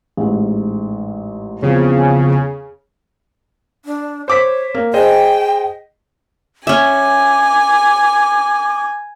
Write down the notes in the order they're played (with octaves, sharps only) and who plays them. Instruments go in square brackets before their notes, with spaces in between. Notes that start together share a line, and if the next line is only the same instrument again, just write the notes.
[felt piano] A1 G#2
[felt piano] E2 F3 C4 [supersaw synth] C#3
[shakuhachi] D4
[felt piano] C5 D6 B6 [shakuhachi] C#5
[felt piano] A#3
[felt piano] G#4 C5 D#5 [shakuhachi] G5
[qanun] C#4 E5 [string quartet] G#5 [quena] D6